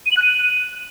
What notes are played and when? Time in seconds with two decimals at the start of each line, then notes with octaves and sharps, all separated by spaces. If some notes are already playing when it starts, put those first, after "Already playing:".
0.06 D#7
0.11 F#7
0.17 F#6
0.22 D#7